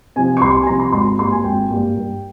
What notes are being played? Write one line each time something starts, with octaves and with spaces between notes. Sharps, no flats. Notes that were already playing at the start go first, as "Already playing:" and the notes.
C3 F3 G#5
C#6
C2 C6
C6
G#5
C3 F3 A#5
C6
G#1 C6
A#5
G2 G3 A#3 C6
G#5
G#1 G5
G2 G3 A#3
G2